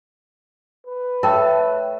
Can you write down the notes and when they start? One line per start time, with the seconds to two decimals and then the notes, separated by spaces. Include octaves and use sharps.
0.86 B4
1.23 A3 A4 C#5 G5